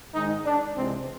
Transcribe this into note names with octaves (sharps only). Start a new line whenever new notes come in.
G#2 D#3 G#3 D#4
D4
C#2 C3 E3 G#3 C4